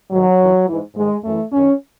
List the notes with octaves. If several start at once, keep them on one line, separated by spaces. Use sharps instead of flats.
G#2 D#3 F#3
F#2 E3
G#2 E3
G#2 D#3 G#3
F#2 E3 A3
F#2 D#3 C#4